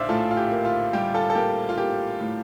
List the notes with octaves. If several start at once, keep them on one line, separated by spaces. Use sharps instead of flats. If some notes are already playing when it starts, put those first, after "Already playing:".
Already playing: A#1 C5 D5 E5 F5
A2 F4 A4
F4
G4
A#3
F4
G3 G4
F4 A4
A4
A#3 G4
F4
A#3 G4
A2